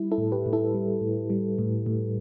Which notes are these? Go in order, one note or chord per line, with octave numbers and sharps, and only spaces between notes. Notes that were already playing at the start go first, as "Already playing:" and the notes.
Already playing: G3 E4
E4 A4
A2
G4 B4
A2
E4 A4
G3
A2
G3
A2
A2